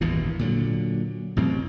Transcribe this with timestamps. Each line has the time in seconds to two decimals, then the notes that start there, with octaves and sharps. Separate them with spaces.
0.01 G#1 E2 G2 A#2
0.39 A#2 D3 F#3
1.37 A1 F#2 C3 C4